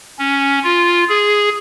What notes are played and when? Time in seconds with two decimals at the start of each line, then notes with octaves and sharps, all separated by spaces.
0.19 C#4
0.63 F4
1.09 G#4